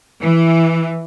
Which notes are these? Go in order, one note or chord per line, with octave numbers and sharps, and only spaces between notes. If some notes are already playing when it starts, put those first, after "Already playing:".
E3